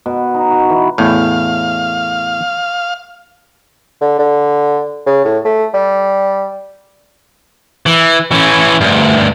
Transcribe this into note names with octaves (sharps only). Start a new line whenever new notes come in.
B2
D#4
F#4
E3
E2 A2 F5
D3
D3
C#3
A2
A3
G3
E3
E3 C#4
D2 G2